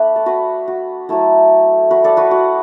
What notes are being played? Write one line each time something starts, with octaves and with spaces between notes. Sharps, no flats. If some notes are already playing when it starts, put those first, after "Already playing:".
Already playing: A3 D4 B4
A4
F#4 B4
F#4
F#3 A3 E4 A4
F#4 B4
A4 D5
F#4 B4
F#4